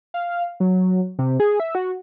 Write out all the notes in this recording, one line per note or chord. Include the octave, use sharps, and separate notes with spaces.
F5
F#3
C3
G#4
E5
F#4